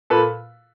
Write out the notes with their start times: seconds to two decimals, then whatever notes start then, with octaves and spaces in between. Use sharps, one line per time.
0.10 A#2 A4 B4